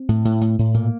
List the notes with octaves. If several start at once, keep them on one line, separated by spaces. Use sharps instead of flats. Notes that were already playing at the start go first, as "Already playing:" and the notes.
Already playing: C4
A2
A2
A2
A2
A#2 A#3